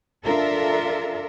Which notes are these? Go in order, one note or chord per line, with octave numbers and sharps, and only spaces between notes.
D4 F4 A4 A#4 E5